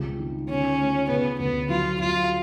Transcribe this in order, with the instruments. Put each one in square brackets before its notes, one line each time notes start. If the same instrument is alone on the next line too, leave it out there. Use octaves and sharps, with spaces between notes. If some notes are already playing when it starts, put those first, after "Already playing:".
Already playing: [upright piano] C#2 G3 C4
D#3
[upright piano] D3 [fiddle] C#4
[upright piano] A3
[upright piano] C#3 [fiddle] B3
[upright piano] D2 [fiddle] B3
[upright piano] F#3 [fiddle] F4
[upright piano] F#3 [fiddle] F4